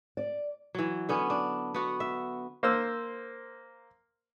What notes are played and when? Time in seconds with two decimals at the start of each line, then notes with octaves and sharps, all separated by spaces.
0.17 D5
0.75 E3 F#3
1.09 D3 B3 C#4
1.30 D4
1.74 B3 F#4
2.00 E5
2.63 A#3 C5 E6